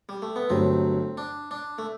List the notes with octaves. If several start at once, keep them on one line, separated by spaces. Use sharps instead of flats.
G3
A3
B3
G1 G2 F#3 A3 C4
D4
D4
A3